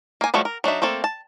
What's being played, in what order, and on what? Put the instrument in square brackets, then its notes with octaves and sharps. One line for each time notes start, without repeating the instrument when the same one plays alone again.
[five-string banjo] A#3 G#5
F3 G3 A3 F#4 C#5
A#4
F#3 D4 D#4 E5
A3 A#3 C4 A4
A5